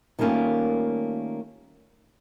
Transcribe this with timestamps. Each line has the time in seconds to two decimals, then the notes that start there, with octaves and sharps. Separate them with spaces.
0.19 D#3 G3 A3 A#3 C#4 F4